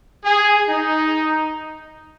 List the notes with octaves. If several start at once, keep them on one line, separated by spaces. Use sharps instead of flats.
G#4
D#4